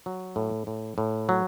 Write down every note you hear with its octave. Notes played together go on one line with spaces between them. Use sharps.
F#3
A2
A2
A2
F#3